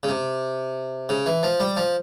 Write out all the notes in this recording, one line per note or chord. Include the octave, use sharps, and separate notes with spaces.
C#3
C3
C#3
E3
F3
G3
F3